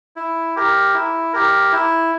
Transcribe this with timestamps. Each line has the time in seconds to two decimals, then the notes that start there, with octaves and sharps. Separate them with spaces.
0.16 E4
0.56 G4 A#4
0.94 E4
1.33 G4 A#4
1.72 E4